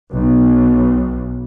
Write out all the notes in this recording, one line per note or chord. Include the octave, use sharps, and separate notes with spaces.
B1